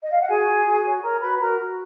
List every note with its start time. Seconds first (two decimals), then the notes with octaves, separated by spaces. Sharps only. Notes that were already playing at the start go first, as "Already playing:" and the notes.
0.02 D#5
0.11 F5
0.20 F#5
0.28 F#4 G#4 G#5
0.47 F#4
0.65 F#4
0.85 C#5
1.03 A#4 C#5 A#5
1.22 F#4 B4 B5
1.40 F#4 A#4 A#5
1.60 F#4